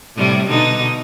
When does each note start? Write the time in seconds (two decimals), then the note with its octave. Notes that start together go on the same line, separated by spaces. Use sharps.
0.16 A2 C3 G3
0.47 B2 D3 D#4